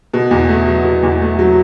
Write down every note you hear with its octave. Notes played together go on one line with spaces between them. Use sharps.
B2
E2
A3
F#3
B2
E2
A3
F#3